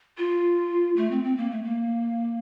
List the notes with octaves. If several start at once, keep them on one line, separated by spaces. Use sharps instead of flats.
F4
A3
C4
C4
A#3
A3
A#3